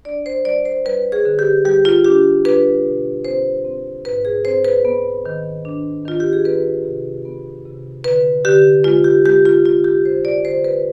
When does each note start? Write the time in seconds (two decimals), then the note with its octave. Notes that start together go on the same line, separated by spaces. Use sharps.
0.05 D4 D5
0.26 C5
0.45 G3 D5
0.66 C5
0.85 G3 B4
1.12 G#4
1.25 D3
1.39 G4
1.65 G3 G4
1.85 F4
2.05 D4 G4
2.45 D4 B4
2.85 B2
3.25 C4 C5
3.65 C4
4.05 G#2 B4
4.25 G#4
4.45 C4 C5
4.64 B4
4.85 B3
5.26 D#3
5.65 D4
6.05 D#3 F4
6.20 G4
6.33 G#4
6.45 B3 B4
6.85 C3
7.25 B3
7.65 C3
8.04 D3 B4
8.45 D3 G4
8.84 G#3 F4
9.04 G4
9.26 G#3 G4
9.45 F4
9.64 D3 F4
9.84 G4
10.05 F2 C5
10.25 D5
10.45 D3 C5
10.64 B4